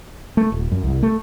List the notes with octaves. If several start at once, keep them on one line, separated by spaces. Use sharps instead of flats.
A3
D#1
F#2
C2
A3